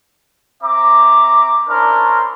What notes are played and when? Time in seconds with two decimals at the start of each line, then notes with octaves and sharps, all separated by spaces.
0.62 C4 E5 A#5 D6
1.68 C#4 D4 E4 A#4 C5 D5